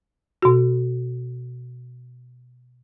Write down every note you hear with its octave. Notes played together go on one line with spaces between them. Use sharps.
B2 F#4